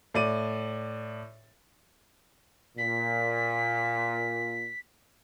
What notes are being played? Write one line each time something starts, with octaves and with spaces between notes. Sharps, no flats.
A2 D5 D#7
A#2 B6